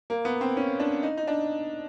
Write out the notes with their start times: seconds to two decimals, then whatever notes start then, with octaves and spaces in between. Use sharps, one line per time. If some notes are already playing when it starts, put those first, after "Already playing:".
0.10 A#3
0.25 B3
0.41 C4
0.57 C#4
0.80 D4
1.03 D#4
1.17 D#4
1.27 D4